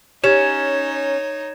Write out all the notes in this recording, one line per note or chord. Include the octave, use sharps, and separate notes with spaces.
C#4 D#4 G4 C#5 G#6 E7